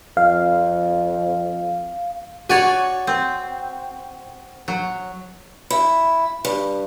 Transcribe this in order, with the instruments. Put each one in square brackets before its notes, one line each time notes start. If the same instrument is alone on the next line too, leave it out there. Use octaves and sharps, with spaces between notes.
[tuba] F2 [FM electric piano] F5
[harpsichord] F#4 [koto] C#5 D5 G#5
[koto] C4
F#3
[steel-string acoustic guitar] E4
G2